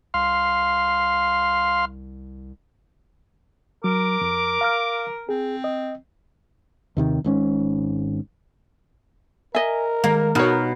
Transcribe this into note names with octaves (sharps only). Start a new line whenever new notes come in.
C2 F5 C6
F#3 A#4 D6
F2
F5 A#5 F6
C4 G#4
D#5
D#2 C3 D#3
G#1 G#2 C#4
A#4 D#5 E5 G#5
D#3 G#3 A#3
B2 D#4 C#5 A#5 F6